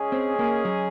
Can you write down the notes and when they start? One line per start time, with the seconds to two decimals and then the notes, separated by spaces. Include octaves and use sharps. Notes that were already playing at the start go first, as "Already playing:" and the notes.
Already playing: G#3 C#4 G#4
0.12 C4
0.39 A#3
0.65 F#3